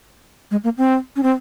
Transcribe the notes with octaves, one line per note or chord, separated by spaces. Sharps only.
G#3
A#3
C4
C#4
C4